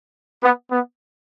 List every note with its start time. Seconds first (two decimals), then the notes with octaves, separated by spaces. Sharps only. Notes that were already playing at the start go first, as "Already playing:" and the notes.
0.43 B3
0.71 B3